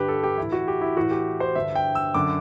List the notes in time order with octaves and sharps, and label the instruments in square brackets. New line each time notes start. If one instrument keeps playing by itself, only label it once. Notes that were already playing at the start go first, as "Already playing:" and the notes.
Already playing: [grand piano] G2 D3 G4 B4
A4
G4
A2 E3 E4
F#4
G4
E4
A2 E3 F#4
G4
C5
G2 D3 E5
G5
E6
F#2 D3 D6